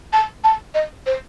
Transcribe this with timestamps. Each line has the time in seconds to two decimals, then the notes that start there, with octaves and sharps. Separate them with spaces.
0.13 A5
0.44 A5
0.74 D#5
1.06 C5